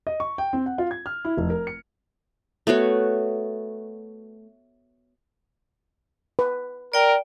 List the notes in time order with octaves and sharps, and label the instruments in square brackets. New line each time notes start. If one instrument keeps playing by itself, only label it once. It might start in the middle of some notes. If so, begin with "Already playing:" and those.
[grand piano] D#5
C#6
G5
C4
F#5
F4
G#6
F6
E4
F1
A#4
C#7
[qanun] A3 B3 F#4 C#5
[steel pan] B4
[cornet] A#4 [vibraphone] D5 G5